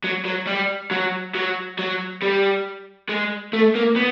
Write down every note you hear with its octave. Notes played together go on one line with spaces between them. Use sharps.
F#3
F#3
G3
F#3
F#3
F#3
G3
G#3
A3
A#3
B3